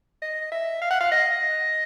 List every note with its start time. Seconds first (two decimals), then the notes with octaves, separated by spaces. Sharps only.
0.22 D#5
0.52 E5
0.82 F5
0.91 F#5
1.01 F5
1.12 D#5